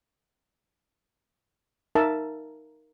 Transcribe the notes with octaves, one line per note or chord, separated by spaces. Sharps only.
D#4 A#4 E5 A5